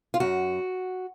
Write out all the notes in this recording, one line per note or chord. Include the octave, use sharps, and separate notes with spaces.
F4
F#2 F#4